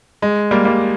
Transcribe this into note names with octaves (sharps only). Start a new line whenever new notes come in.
G#3
G3 A#3
G3 A#3